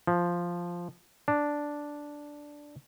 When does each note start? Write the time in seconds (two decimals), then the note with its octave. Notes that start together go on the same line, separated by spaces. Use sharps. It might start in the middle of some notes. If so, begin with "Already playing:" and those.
0.07 F3
1.28 D4